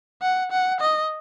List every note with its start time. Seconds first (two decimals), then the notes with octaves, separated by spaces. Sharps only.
0.22 F#5
0.52 F#5
0.81 D#5